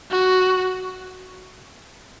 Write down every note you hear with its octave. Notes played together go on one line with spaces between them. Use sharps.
F#4